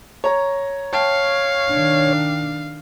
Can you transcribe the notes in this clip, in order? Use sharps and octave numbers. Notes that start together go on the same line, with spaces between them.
C#5 A#5
C#5 F5 G5 A5
D#3 D4